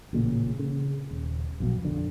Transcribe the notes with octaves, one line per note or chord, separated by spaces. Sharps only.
A1 A#2 C#3
C#3
D#1
A#1 F2 B2 F#3
F2 D3